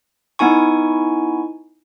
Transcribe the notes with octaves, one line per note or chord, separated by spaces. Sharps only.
B3 D#4 E4 G#5 C#6